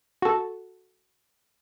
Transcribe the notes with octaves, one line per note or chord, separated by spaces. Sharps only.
F#4 A4